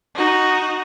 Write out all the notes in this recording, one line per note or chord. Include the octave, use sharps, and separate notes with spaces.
D#4 F#4